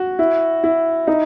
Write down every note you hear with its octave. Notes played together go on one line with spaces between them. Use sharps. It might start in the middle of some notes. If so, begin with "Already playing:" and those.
Already playing: F#4
E4
E4
D#4